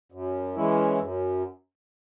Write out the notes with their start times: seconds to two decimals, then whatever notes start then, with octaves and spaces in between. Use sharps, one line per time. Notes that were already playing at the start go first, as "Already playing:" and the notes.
0.12 F#2
0.56 E3 G#3 C#4 E4
0.99 F#2